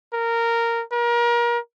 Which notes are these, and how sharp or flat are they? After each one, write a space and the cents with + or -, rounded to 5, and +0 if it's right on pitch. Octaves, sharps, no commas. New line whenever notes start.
A#4 -10
A#4 +30